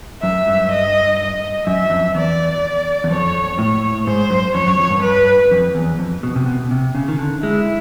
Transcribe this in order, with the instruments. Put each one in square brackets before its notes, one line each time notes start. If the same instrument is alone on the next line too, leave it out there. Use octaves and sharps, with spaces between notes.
[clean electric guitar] F#2 [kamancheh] E5
[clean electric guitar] G2
[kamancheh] D#5
D#5
[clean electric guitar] F#2 [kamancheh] E5
[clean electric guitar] F2
[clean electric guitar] E2 [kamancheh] D5
[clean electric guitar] E2
[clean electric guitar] F2 [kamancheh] C#5
[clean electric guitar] A2 [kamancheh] C#5
[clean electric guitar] G#2 [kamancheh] C5
[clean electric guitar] F#2
[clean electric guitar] F2 [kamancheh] C#5
[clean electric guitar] F#2
F2
G2
[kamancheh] B4
[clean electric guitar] F2
E2
F2
B2
C3
B2
C3
C#3
D#3
D3
[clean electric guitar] G#3 [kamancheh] E4